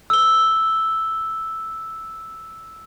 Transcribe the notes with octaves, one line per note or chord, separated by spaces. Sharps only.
E6 G7